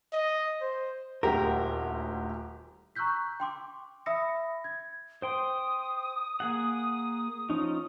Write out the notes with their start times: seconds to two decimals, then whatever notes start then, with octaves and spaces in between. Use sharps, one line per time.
0.12 D#5
0.61 C5
1.23 D#1 D2 G4 A#4
2.96 A#5 C#6 E6 F#6 G6 B6
3.40 G5 C6 D6
4.06 E5 B5 D#6 E6 A#6 C#7
4.64 G#6
5.22 C5 G5 C6 D#6
6.40 A#3 G#4 F#5
7.50 F3 C#4 D#4